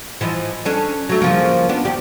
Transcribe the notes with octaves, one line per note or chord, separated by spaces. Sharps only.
E3 F3 D#5
C#4 D4 A4
F#3 A3
C#3 F3 A#3
B3 D4
D#2 G4 D5